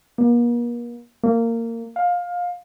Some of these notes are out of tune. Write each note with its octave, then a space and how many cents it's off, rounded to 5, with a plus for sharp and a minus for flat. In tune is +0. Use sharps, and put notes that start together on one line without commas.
A#3 +40
A#3 -20
F5 +20